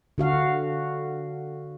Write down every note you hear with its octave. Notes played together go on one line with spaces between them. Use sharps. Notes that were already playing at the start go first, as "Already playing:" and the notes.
D3 F#4 F5